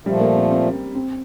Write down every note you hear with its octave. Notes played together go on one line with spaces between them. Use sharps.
A#2 F3 G3 A3
A#3
C4
C4
C4
C4